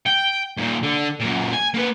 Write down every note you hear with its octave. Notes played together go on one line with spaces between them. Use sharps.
G5
D#2 A#2
D3
F#2 A#2
G#5
A#3 B4